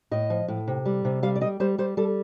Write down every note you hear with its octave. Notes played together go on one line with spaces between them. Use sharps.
A2 D#5
F3
A2
C3
G3
C3
G3 F5
D5
G3 D#5
G3 C5
G3 C5
G3 A4